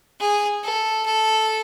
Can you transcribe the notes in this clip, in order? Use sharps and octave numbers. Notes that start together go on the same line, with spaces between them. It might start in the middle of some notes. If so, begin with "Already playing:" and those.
G#4
A4
A4